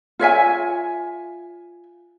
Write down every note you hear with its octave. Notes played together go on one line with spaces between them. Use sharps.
F4 C#5 E5 G#5